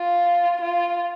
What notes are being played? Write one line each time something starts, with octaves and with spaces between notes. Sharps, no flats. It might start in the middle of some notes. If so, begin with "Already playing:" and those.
Already playing: F4
F4